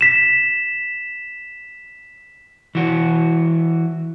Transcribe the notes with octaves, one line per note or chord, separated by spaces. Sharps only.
B6 E7
E3 F#4